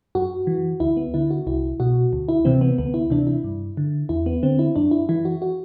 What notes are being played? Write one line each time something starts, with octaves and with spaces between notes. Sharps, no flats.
F#2 F#4
E3
D2 E4
B3
D3 E4
F#4
C2 E4
B2 F#4
D2
E4
C3 E3 C4
B3
D2 B3
E4
C3 E3 D4
E4
G2
D3
E2 E4
B3
D3 C4
E4
F#2 D4
E4
E3 E4
F#4
F#4